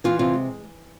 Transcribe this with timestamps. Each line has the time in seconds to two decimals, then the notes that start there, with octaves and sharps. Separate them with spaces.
0.04 E3 F4
0.19 C3 F4
0.33 G#3